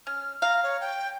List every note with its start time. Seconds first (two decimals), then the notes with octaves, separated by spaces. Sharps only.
0.07 C#4 F6
0.42 F5 A#5
0.63 C#5
0.80 G5